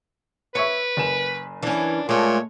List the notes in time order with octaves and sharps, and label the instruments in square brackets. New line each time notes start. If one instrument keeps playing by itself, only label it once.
[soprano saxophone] B4 [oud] C#5 [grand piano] E5 C#6 C#7
[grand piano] F#1 G#5 E7
[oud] E3 C#4 [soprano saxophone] D4
[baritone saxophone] A#2 [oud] G#3 A3 [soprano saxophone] C#5